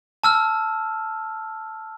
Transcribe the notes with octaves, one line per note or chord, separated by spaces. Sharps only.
A5 E6 F6